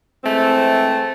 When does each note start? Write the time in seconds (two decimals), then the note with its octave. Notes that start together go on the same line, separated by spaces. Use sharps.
0.24 E3 G#3 A3 C4